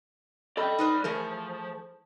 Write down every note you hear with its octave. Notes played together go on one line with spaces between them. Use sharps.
A4 D5 D#5 G5 B5
D#4 B4 C5
E3 F3 A3 G#4 A#4